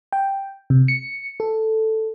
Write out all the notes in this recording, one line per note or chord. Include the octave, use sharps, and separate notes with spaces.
G5
C3
C#7
A4